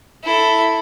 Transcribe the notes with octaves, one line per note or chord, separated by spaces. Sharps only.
E4 A4